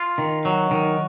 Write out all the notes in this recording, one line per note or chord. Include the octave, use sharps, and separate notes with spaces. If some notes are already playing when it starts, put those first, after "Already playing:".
Already playing: F4
D#3
F#3
D#3